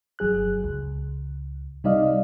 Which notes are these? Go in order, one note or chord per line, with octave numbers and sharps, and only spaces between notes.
G1 F#3 G#4 F#6
C#2
C3 G3 D#4 D5 D#5 F5